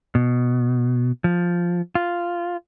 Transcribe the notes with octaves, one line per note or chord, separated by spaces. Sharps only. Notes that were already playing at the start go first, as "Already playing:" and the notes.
B2
F3
F4